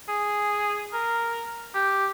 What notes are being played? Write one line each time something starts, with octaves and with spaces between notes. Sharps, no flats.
G#4
A#4
G4